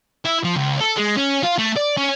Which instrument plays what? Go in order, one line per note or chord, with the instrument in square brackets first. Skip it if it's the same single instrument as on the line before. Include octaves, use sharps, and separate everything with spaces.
[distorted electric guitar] E4
F3
C#2
A4
G#3
C#4
F4
A3
D5
C#4